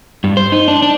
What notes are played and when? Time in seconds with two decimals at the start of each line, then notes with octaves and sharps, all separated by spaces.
0.24 G2
0.37 C5
0.52 D#4
0.68 D4
0.82 D4